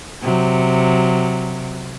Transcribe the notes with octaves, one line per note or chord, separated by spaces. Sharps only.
C3 F#3